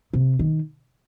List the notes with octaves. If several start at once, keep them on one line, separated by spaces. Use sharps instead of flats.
C3
D#3